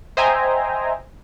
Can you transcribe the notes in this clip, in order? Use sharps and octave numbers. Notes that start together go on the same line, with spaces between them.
C5 D#5 E5 G5 G#5 A#5